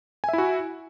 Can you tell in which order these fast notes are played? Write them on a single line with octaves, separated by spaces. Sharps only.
G#5 E5 E4 F#4